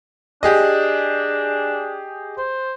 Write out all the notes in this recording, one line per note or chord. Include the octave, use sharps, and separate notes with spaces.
D4 G4 G#4 D#5
C5